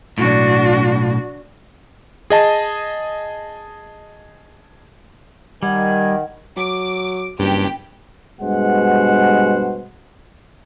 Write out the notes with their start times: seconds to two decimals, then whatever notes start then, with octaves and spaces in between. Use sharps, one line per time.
0.18 B1 A2 D4 F#4
2.30 G#4 D#5 A5
5.63 D#3 G3 F#5 G#5
6.57 F#3 D6
7.39 F#1 G2 G4
8.41 G2 B2 G#3 C5 F#5